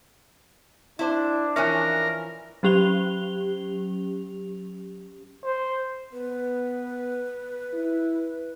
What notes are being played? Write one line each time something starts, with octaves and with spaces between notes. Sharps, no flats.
D4 E4 C5
E3 F3 C#4 A#4 E5 G#5
F#3 C#4 G4 F7 G7
C5
B3 B4
E4